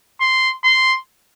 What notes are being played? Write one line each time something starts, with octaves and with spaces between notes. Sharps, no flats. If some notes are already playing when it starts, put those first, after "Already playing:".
C6
C6